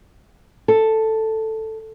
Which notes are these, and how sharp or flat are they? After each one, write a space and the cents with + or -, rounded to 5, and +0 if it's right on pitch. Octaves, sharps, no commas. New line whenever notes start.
A4 +5